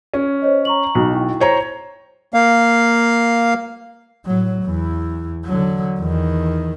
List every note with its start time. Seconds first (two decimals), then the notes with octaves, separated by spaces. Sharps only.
0.14 C#4
0.42 C5 C#5 D#5
0.65 A#5 C#6 F#7
0.95 B1 B2
1.12 E4 G5 C#6
1.40 C5 C#5 A#5
2.34 A#3 F5
4.26 A2 F#3
4.63 E2 E3
5.45 D3 F#3
6.00 E2 D#3